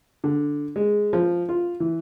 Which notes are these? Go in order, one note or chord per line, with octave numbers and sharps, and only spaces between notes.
D3
G#3
F3
F4
E3